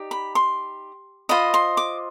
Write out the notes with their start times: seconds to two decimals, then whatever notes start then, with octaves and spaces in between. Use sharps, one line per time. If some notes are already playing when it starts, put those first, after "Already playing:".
Already playing: D#4 G4 D5
0.11 B5
0.35 C6
1.29 F4 C5 D#5 B5
1.54 C6
1.77 D6